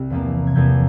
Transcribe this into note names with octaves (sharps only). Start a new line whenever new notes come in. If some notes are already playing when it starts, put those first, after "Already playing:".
Already playing: C2
E2 C3 F3 A#3
G#6
E2 C3 F3 A#3 G6